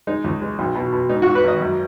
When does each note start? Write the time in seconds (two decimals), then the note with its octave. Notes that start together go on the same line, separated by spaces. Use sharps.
0.07 G#3 D#4
0.24 C#2
0.41 G#3
0.59 B1
0.75 B2
0.92 B2
1.09 G#2 D#4
1.22 G#2 F#4
1.35 B4
1.43 G#1 D#5
1.61 F#2